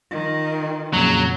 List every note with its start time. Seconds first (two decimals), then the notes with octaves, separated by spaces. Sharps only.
0.11 D#3 F4
0.93 F2 A#2 C#3 F#3